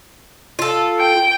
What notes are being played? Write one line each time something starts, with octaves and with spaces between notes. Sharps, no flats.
F4 A4
G5